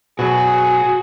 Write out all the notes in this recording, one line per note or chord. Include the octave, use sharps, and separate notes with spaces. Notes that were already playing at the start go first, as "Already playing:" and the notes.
B2 F#3 F#4 G#4